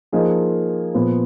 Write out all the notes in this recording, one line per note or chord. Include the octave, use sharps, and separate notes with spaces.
F3 A#3 D#4 G#4 D#5
A#2 F3 B3